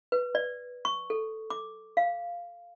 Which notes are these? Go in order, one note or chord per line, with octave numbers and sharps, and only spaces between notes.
B4
D5
C#6
A4
D6
F5